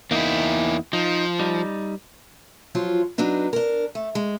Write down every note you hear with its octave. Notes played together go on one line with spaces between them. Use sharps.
E2 A#3 D#4 E4
F3 D#4
G3 D#4
F3 F#3 F4
F#3 B3 D4 D#4
D4 A#4
A3
G#3